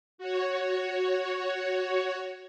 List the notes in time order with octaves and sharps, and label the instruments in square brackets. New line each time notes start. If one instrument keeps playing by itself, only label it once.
[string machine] F#4 C#5